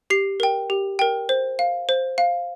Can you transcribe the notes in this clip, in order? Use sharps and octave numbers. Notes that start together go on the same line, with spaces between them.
G4 C7
A#4 G5
G4
A#4 G5
C5
F5
C5
F5